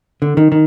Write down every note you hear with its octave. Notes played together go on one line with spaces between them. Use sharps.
D3
D#3
D#3